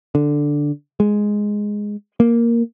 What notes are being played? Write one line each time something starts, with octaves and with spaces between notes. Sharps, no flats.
D3
G#3
A#3